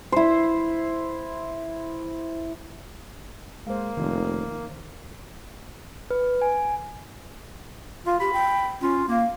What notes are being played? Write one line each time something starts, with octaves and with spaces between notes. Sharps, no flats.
E4 C5
G#3 A#3 C5 F5
F1 D#3
B4
G#5
F4 F5
G4 B5
G5
C#4 F4
A#3 F5